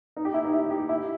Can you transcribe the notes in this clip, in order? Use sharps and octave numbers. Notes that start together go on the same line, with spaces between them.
D#4
G4
E4
D#4
E4
G4
E4